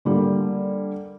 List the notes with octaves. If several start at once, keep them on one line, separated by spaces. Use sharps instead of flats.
D3 G3 A#3